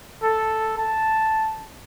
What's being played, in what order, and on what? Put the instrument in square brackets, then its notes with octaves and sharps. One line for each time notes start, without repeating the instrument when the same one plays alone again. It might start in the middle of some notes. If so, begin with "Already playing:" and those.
[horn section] A4
A5